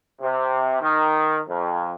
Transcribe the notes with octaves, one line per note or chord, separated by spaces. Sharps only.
C3
D#3
F2